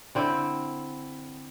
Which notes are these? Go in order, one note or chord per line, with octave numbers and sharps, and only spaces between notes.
D3 C4 E4